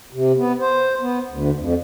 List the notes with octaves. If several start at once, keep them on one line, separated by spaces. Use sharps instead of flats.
C3
B3
C5
B3
D2
F2